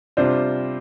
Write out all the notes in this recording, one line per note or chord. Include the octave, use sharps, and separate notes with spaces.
C3 G3 D4 F4 C5